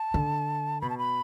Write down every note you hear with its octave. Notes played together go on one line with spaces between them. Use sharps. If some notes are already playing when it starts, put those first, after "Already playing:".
Already playing: A5
D3
B2 B5
A5
B5